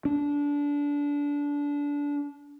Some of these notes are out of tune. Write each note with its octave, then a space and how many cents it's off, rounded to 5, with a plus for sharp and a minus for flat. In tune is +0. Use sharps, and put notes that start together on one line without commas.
D4 -25